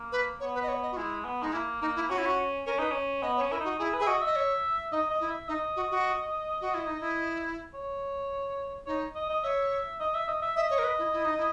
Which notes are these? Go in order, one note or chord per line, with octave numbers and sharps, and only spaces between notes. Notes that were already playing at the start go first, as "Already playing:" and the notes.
Already playing: A#3
B4
B3 C#5
B4
D#5
C#5
D#5
F#4
G#3 E4
B3
G#3 D#4
A#3 E4
A#3 D#4
E4
C#4 F#4
E4
F#4
C#4 A#4
D#4 B4
C#4
B3 D#5
C#5
C#4
E4 A#4
D#4 F#4
E4 G#4
B4
G#4 E5
F#4 D#5
D#5 E5
C#5
D#4 D#5
D#5
E4
E5
D#4 D#5
F#4
F#4
F#4
E4
D#4
E4
C#5
D#4 C#5
D#5
D#5
C#5 E5
D#5
E5
D#5
E5
D#5 E5
C#5
A#4
B4
E4
E4
D#4
E4